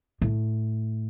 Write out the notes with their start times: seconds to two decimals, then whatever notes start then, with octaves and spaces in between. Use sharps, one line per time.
0.22 A2